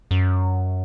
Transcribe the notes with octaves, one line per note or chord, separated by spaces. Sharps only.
F#2